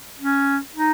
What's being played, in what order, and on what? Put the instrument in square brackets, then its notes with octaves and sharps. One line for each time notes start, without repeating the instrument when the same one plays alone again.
[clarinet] C#4
D#4